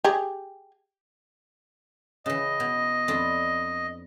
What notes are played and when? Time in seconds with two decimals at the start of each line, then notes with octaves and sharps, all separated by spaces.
0.04 G4 G#4
2.26 C#3 E3 D#5
2.60 B2
3.08 F2 D4 E4